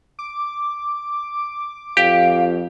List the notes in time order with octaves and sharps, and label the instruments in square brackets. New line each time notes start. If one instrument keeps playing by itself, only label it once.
[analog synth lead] D6
[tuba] F2 [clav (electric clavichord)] G4 [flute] F5